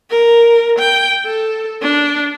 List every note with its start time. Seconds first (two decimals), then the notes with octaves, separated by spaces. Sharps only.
0.10 A#4
0.79 G5
1.26 A4
1.82 D4